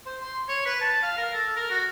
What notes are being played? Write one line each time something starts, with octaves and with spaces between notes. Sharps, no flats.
C5
C6
C#5
B4
A5
F5
A#4
A4
A#4
F#4